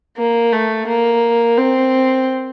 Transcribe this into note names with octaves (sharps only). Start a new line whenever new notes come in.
A#3
A3
A#3
C4